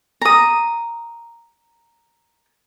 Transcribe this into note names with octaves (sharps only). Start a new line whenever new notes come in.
A#5 D#6